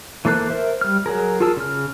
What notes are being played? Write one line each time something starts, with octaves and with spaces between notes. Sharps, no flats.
E3 A#3 A4 C5 F#6
A#4 C5 E5
G3 F6
F#3 G#4 A#4
F4 G#4 A#4 A5 E6
C#3 F6